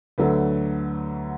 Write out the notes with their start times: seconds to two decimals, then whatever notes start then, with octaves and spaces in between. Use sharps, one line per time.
0.18 D2 D3 F#3 A3 B4